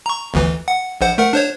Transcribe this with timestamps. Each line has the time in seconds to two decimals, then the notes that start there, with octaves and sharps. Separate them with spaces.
0.06 A#5 C#6
0.34 G1 D2 E3
0.68 F#5
1.01 A#1 C5 F#5
1.18 A3 A#4 F#5
1.33 D4 C5 C#5